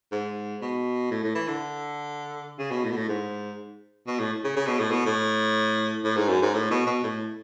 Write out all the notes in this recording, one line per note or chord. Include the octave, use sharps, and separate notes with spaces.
G#2
B2
A2
A2
E3
D3
C#3
B2
A2
B2
A2
G#2
B2
A2
C#3
C#3
B2
A2
B2
A2
A2
G#2
F#2
G#2
A2
B2
B2
A2